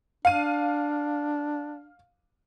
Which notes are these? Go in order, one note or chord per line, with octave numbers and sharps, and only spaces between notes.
D4 F5 D#7